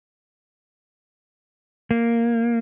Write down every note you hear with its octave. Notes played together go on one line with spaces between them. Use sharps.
A#3